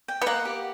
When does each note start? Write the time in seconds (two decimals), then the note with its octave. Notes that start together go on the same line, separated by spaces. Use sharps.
0.08 G5
0.22 B3
0.26 A#3 F#5
0.45 G4